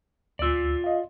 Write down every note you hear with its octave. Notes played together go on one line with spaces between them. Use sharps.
D2 F4 D5 E6
D#5 F5